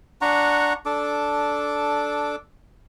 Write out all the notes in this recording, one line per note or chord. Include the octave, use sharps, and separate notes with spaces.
D4 F#5 A#5 C#6
D4 A4 D6